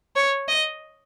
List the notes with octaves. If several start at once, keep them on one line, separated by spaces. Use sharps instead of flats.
C#5
D#5